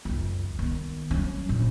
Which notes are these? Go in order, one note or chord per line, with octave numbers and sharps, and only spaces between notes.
C#2 F#2
D#3 B3
F#3 C#4
A#1 A#2